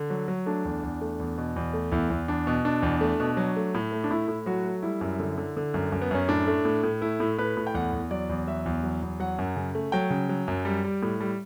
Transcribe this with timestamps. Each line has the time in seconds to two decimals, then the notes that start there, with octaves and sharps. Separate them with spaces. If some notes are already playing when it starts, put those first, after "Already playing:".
Already playing: D3
0.10 F#3
0.28 F#3
0.46 A3 D4
0.65 E2
0.83 E2
1.01 A3
1.20 E2
1.38 B2
1.56 E2
1.74 A3
1.91 E2 E4
2.10 E2
2.28 E2 D4
2.47 B2
2.65 B2 D4
2.83 E2
3.01 A3
3.20 B2
3.37 F#3
3.56 A3
3.74 A2
3.92 A3
4.04 D4
4.10 A2 E4
4.28 A2
4.46 F#3 F#4
4.65 A3
4.83 G3 E4
5.01 F#2
5.19 D3
5.38 D3
5.57 D3
5.74 F#2
5.92 F#2
6.02 B3
6.11 F#2 C#4
6.28 A2 D4
6.47 A3
6.65 A2
6.83 A2
7.01 A3 E4
7.20 A2
7.38 A2 B4
7.57 A2
7.67 G5
7.74 E2 F#5
7.93 E2
8.11 F#3 D5
8.29 E2
8.47 F#3 E5
8.66 E2
8.84 F#3
9.02 E2
9.20 F#3 F#5
9.39 F#2
9.56 C#3
9.75 A3
9.92 F#3 G5
10.10 C#3
10.29 F#3
10.48 F#2
10.65 G3
10.84 G3
11.02 A2
11.21 G3